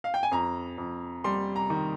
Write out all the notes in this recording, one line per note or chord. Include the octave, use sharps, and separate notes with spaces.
F5
G5
G#5
F2 A#5
F2
G3 C6
A#5
D#3